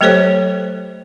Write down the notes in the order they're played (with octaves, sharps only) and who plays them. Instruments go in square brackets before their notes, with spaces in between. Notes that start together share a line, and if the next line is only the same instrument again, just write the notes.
[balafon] F#3 A3 G4 A4 C5 C#5